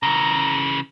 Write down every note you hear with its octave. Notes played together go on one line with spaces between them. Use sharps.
C#3 E3 A#5